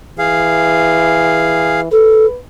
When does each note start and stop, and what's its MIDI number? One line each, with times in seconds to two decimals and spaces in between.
0.18 1.88 52
0.18 1.81 68
0.18 1.81 77
1.92 2.26 69
1.92 2.37 71